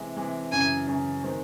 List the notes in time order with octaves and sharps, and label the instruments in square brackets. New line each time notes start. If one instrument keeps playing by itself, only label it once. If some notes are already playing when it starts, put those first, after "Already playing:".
Already playing: [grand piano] C3 E3 G#3
C3 E3 G#3
[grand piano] F#2 C#3 E3 [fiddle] G#5
[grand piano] F#2 C#3 E3
D#3 G#3 C4